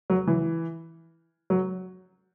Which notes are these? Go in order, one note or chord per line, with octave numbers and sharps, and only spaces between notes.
F#3
E3
F#3